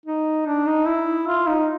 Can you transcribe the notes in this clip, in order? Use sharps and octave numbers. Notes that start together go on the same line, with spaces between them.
D#4
D4
D#4
E4
F4
D#4